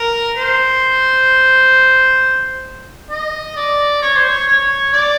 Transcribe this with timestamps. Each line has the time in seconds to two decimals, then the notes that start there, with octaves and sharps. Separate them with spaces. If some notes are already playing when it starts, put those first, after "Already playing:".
Already playing: A#4
0.37 C5
3.11 D#5
3.56 D5
4.02 C#5
4.16 C5
4.28 C#5
4.48 C#5
4.93 D5